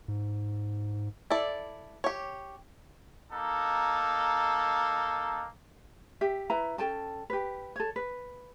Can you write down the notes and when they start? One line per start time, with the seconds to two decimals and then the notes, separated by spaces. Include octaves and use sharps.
0.08 G#2
1.30 E4 A4 D5
2.04 G4 C#5
3.32 A#3 D#4 A4
6.21 G4 E5
6.50 E4 B4 A#5
6.78 C#4 A4 G5 A5
7.30 G4 B4
7.76 A4 C#5
7.96 B4